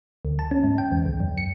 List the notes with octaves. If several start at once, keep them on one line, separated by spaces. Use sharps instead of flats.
D2
A5
C#4
G#2
G5
E2
C#2
F#2
C#7